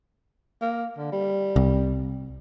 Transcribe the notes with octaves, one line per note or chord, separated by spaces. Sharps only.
A#3
D3
G3
C2